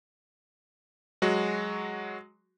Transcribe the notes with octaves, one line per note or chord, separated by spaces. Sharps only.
F#3 G#3 F#4